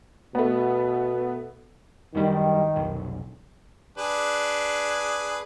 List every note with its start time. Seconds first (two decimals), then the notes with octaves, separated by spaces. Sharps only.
0.35 B2 A3 B3
2.15 F#2 D#3 G3
2.76 F1 B1
3.98 D4 G#4 B4